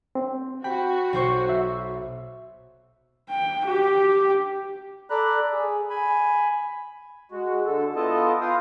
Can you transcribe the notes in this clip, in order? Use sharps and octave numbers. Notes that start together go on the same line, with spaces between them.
C4
F#4 G5 B5
B1 C5 C#6
E5
G5
G4
A4 D5 A#5 B5 F#6
G#4
G#5 B5
G#3 F#4
D3 A4
B3 E4 F4 A4 D#5 A5
B4 F5 G5 C6 D#6